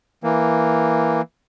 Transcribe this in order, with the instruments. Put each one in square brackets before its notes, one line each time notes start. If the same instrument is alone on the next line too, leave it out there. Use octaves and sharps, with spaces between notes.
[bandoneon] E3 A#3